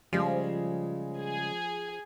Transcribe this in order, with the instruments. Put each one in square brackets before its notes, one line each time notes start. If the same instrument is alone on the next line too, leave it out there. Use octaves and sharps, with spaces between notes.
[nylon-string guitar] C#3 G3 G#3 [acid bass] F3
[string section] G#4